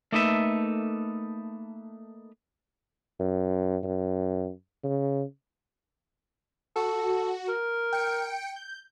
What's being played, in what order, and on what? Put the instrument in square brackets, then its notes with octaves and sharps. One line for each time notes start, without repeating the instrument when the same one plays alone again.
[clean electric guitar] A3 A#3 D#4 A4 B4 E5
[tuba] F#2
F#2
C#3
[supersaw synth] F#4 [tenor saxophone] A4
[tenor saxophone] A#4
[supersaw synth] G5 C#7 D7
G6